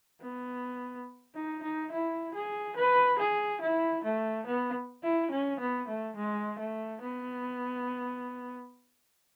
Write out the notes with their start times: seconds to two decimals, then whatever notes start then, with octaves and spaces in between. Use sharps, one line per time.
0.22 B3
1.35 D#4
1.63 D#4
1.92 E4
2.34 G#4
2.77 B4
3.19 G#4
3.62 E4
4.04 A3
4.47 B3
5.03 E4
5.31 C#4
5.60 B3
5.88 A3
6.16 G#3
6.59 A3
7.02 B3